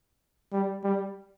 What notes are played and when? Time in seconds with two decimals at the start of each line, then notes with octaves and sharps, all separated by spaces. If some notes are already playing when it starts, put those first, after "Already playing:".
0.52 G3
0.83 G3